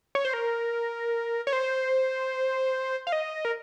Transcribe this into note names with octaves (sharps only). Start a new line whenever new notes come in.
C#5
C5
A#4
C#5
C5
F5
D#5
A#4